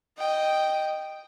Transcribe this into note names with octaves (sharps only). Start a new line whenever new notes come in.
D#5 G5